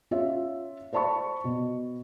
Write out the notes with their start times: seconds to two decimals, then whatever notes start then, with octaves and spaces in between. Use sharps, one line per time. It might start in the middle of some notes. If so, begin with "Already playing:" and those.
0.11 C#4 F4 C#5 E5
0.93 C5 D5 A5 B5 C#6
1.44 B2